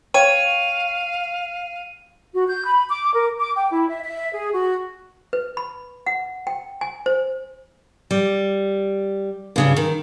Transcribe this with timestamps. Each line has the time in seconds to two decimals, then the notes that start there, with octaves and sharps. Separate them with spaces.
0.14 C#5 F5 G5 D#7
2.32 F#4
2.47 G6
2.65 B5
2.89 D6
3.14 A#4
3.38 D6
3.55 G5
3.72 E4
3.88 E5
4.04 E5
4.33 G#4
4.53 F#4
5.33 B4
5.57 B5
6.06 F#5
6.47 G5
6.81 G#5
7.06 C5
8.11 G3
9.56 G2 C#3 F#3
9.76 D#3